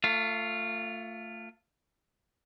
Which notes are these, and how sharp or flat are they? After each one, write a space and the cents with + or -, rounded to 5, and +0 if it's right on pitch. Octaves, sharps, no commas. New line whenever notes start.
A3 +25 F4 +0